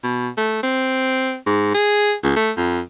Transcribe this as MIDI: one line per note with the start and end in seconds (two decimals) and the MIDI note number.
0.03 0.29 47
0.37 0.62 57
0.63 1.36 60
1.46 1.74 44
1.74 2.14 68
2.23 2.33 37
2.36 2.51 57
2.57 2.80 41